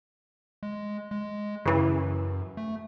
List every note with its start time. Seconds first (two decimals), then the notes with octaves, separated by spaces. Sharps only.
0.63 G#3
1.11 G#3
1.66 F#2 C#3 E3
2.57 A3